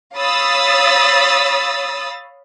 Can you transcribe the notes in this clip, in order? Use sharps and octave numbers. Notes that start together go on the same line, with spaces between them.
C#5 F5 B5 D#6 E6 A6